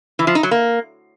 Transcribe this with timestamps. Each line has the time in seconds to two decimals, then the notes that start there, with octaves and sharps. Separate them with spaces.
0.19 E3
0.27 F3
0.35 D#4
0.43 F#3
0.51 A#3